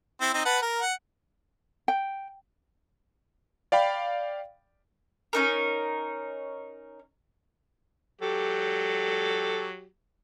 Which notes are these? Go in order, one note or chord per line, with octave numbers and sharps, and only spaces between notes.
C4 E4
C4 D#4
B4 F#5 A5
A#4
F#5
G5
D5 F5 G5 B5
C#4 D#4 A#4
F#3 G4 A4